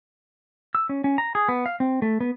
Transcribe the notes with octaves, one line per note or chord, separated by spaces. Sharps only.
E6
C#4
C#4
A#5
G#4
B3
F5
C4
A3
B3